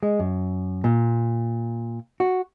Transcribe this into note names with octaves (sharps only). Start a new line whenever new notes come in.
G#3
F#2
A#2
F#4